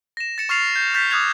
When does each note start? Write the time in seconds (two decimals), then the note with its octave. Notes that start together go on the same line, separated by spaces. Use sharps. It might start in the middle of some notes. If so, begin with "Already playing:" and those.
0.17 A#6 E7
0.38 A6 C#7 E7
0.49 C#6 F6 A6 C7 F7
0.76 G6
0.94 F6 G6 A6 B6 C7
1.11 D6 D#6 F6 F#6 G#6 F7